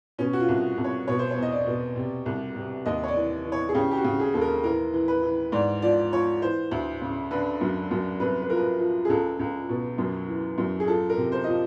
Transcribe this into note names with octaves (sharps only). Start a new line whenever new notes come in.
B2 C#4
F#4
F4
C2
C2
C#5
B2 C#5
C5
C#5
E2
D#5
D5
B2
C3
C2
C3
D#2 D#5
C#5
D5
E3
E3
C#5
G#4
C#3 G4
G4
F#4
C#3
G#4
D#2 A4
A#4
E3 A#4
E3
B4
E3
G#2 D5
F3 D5
F3 C#5
E3 C5
D2
C#3
D3 B4
F#2
F#2
C2 B4
B4
F3 A#4
B4
F3
G#4
C#2 A4
C#2
B2
F#2
E3
F#2
G#4
F3 A4
A#4
C3
C5
F3 D#5